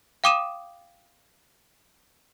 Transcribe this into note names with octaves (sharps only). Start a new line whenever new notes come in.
F5 G5 D6 D#6 D#7 E7